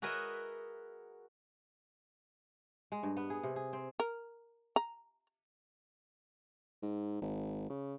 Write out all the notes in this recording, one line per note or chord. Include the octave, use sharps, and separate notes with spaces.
F#4 G#4 A#4 B4 D#5 E5
G#3
G2
B3
G#4
C3
G#4
C4
A#4
A#5
G#2
G#1
C#3